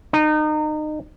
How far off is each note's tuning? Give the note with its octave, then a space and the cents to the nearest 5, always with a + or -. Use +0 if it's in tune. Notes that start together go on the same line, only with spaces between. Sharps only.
D#4 -30